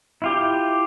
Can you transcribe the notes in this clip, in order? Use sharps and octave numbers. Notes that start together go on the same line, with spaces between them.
E4 F4 G4